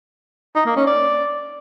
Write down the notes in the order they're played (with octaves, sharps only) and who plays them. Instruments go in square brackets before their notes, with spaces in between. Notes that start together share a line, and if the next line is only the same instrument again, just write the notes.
[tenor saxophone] D#4
A#3
C#4
D5